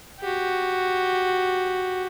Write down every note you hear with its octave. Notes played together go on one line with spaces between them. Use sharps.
F#4 G4